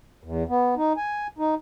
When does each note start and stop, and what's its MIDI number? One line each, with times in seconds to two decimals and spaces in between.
0.24 0.44 40
0.49 0.74 59
0.77 0.93 63
0.97 1.27 80
1.39 1.55 63